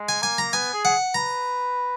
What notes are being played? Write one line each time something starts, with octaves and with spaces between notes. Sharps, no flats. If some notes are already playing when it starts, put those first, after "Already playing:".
Already playing: G#3
G#5
A#3 G#5
A#5
B3 G#5
G#4
F#5
B4 A#5